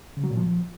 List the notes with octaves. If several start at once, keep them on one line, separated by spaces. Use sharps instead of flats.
C#3
F#3
A#2
F3